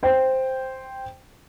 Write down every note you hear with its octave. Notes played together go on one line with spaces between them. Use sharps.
C5 G5